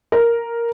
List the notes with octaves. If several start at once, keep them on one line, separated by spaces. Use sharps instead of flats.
A#4